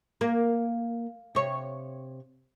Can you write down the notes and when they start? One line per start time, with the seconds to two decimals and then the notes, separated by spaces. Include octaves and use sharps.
0.21 A#3
1.35 C3 C#5